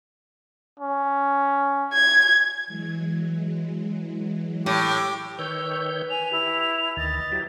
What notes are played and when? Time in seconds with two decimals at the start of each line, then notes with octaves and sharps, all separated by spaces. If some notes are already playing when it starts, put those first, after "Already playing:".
0.80 C#4
1.93 G#6
2.67 E3 F#3 G#3
4.66 A2 G4
5.39 D#3 B4 C#5 E6 G6
6.10 G#5 F7
6.32 E4 G4
6.97 D2 D#3 D#5 A6
7.32 F#3 E4 G4